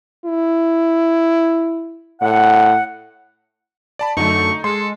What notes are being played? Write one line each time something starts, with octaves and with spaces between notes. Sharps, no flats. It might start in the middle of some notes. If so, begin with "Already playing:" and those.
E4
A2 F#5
D5 A5 B5
F#2 D3 A3 D#4 C#6
G#3 A4 C6